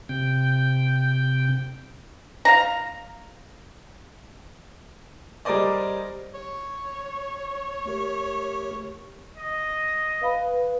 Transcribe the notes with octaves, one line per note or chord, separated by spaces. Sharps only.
C3 G5
F5 A#5
G3 G#4 A#4 C5 D5 D#5
C#5
A3 G4 A#4
D#5
B4 F5 B5